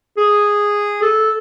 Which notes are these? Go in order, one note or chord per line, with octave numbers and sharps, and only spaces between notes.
G#4
A4